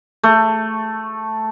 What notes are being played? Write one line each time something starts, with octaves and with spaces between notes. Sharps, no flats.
A3